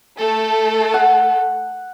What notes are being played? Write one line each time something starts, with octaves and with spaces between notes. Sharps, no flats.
A3 A4
F#5